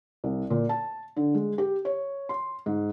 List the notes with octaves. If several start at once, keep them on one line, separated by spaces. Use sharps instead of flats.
C2
A#2
A5
D3
G#3
G4
C#5
C6
G#2